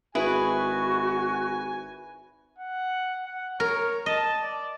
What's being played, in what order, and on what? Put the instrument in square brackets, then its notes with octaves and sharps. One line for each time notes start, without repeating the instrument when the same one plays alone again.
[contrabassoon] G#1 [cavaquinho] E4 G#4 B4 [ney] F#4 [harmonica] G#5
[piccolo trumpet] F#5
F#5
[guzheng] A#4 [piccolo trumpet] C#5
[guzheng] D#5 [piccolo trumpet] A5
[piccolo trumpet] D5